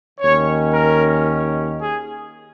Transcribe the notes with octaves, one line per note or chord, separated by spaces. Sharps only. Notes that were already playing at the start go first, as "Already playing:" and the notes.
D#2 D#3 C#4 C#5
A#4
G#4